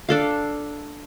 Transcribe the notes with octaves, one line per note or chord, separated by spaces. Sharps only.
D4 A4 F5